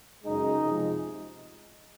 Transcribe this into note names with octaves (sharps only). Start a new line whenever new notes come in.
F#2 C#3 G#3 D#4
C3 F3 G#3